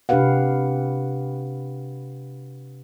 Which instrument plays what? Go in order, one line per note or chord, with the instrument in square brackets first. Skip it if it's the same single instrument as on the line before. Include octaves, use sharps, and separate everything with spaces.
[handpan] C3 D4 G4 B4 F5 F#5